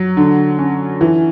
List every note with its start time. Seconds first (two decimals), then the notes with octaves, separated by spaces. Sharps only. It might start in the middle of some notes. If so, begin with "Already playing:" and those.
Already playing: F#3
0.17 D3
0.58 C#4
1.01 E3